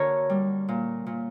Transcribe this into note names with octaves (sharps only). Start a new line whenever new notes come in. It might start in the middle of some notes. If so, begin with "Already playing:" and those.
Already playing: D3 A#3 F#4 A#4 C#5
G3
A#2
A#2